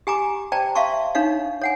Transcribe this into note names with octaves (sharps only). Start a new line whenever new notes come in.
G4 G#5 A#5 D6
C5 D5 G5 A5 A#5
E5 F5 A5 C6 C#6
D4 D#4 C#5 F5
C#5 F#5 G#5